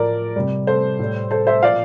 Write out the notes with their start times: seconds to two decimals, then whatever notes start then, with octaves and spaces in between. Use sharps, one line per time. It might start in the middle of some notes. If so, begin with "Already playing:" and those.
Already playing: A2 F3 A#4 D5
0.36 C3 G3
0.67 A4 C5
0.99 A2 G3
1.31 A4 C5
1.47 C5 E5
1.63 A#2 F3 D5 F5